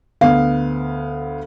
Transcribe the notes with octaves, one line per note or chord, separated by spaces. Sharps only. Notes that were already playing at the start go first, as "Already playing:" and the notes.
D2 B3 F5